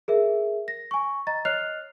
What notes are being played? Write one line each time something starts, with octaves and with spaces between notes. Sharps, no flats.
G#4 A#4 E5
A#6
G#5 C#6
D#5 A#5 A6
C#5 D#5 F6 F#6 C7 F7